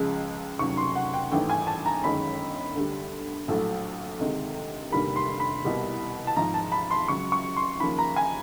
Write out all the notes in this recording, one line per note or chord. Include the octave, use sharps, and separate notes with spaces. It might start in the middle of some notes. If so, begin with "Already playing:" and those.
Already playing: C#2 C#3 F3 G#3
F1 D#2 C#3 F#3 C#6
C6
F#5
G5
G#1 G2 E3 A3 G5
G#5
A5
A#5
G1 F#2 D#3 G#3 B5
D2 D3 G3
A#1 A2 F#3 A3
D2 C3 D#3 G#3
F1 D#2 D3 G3 A#3 B5
C6
B5
C2 B2 G3 A#3
A5
G#1 G#2 F3 A#5
A5
B5
C6
C#2 C#3 F#3 C#6
C#6
C6
D#2 C#3 F3 A#3 B5
A#5
G#5